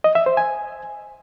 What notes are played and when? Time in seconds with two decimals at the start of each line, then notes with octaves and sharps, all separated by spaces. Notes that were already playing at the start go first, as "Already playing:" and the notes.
0.04 D#5
0.15 E5
0.26 C5
0.37 G#5